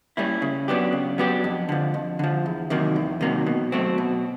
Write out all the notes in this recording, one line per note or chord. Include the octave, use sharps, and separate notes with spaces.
G3 A#3 C#4 E4
C#3
F#3 B3 D4 G4
C#3
F#3 B3 D4 G4
F2
D3 F3
F2
D3 F3
E2
C3 D#3 F#3 A#3
E2
C3 D#3 F#3 A#3
B2
F#3 A3 C4
B2